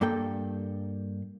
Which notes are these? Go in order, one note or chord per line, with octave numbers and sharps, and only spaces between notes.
G2 A#3 A4 G5